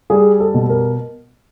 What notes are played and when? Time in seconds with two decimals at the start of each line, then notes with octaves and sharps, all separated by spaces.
0.10 G3 G#4
0.40 A4
0.54 B2
0.69 A#4